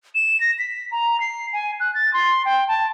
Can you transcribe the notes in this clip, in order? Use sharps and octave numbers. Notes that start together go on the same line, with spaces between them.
E7
A#6
B6
A#5
C7
G#5
F#6
A6
C6
G5
A5